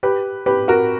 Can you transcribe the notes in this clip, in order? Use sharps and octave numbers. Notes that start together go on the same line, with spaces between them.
G4 B4
G4 B4
F#4 A#4